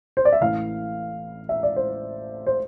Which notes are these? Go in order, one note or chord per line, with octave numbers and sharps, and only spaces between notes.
C5
D5
E5
A1 A2 E3 F5
E5
D5
C5
C5